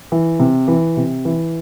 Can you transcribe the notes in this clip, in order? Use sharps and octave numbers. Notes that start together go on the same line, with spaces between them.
E3
C3
E3
C3
E3